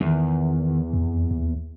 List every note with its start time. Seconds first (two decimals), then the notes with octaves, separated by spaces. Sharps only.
0.01 E2 D#3
0.93 F2
1.31 D#2